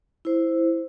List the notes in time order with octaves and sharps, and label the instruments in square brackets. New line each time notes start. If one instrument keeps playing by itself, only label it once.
[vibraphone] E4 C5